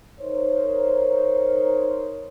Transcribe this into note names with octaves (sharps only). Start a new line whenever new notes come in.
D#4 A#4 C5 C#5